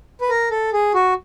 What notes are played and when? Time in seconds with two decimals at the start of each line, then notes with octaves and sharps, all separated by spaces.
0.21 B4
0.29 A#4
0.51 A4
0.73 G#4
0.94 F#4